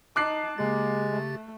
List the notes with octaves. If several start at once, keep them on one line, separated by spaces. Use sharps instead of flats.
D#4 A5 D6 F#6 C7
C#3 G#3 A#3 G4 A6
A3